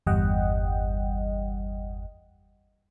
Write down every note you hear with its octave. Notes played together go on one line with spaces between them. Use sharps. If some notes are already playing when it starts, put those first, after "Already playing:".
G1 E2 G3 D#5 F#5 G5